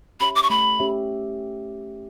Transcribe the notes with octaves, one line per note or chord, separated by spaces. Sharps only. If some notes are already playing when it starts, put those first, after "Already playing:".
C#4 G4 C#5 E5 B5
D6
C#6
A3 B5
C#4 G4 C#5 E5